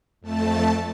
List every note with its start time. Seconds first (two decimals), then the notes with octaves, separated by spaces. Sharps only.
0.21 F2 A3 A5